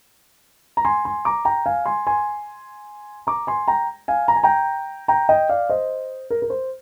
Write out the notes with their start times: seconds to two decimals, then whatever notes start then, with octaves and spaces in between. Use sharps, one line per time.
0.77 A#5
0.85 G#5 C6
1.05 G#5 C6
1.25 A#5 D6
1.45 G5 A#5
1.66 F5 G#5
1.86 G#5 C6
2.07 G#5 C6
3.27 A#5 D6
3.47 G#5 C6
3.68 G5 A#5
4.08 F5 G#5
4.28 A#5
4.36 G#5
4.43 G5 A#5
5.08 G5 A#5
5.29 D#5 G5
5.49 D5 F5
5.69 C5 D#5
6.30 A#4
6.42 A#4
6.50 C5